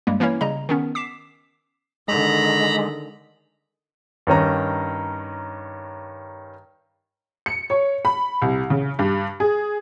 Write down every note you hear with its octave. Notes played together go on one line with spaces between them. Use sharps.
G2 G3 G#3 A#3
E3 A#3 C#4 E4 C#5
C#3 G3 D#5 A#5
D#3 B3 C#4
D6 B6 C7 E7
D3 D#3 G#3 A#5 B5
G2 D#3 C#4 A#5
C#7
C#5
B5
C2
C#3
G2
G#4